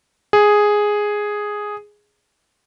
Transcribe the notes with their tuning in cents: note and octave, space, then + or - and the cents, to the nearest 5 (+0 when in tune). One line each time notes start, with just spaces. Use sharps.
G#4 +0